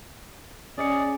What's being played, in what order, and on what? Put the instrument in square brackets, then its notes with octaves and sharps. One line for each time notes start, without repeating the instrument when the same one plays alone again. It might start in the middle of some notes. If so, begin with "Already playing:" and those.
[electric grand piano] C#4 D#5 C#7 [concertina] G#4 D5